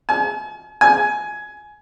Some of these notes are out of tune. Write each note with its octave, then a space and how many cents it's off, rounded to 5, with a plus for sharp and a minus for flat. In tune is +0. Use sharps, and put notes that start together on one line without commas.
G#5 +40
G#5 +15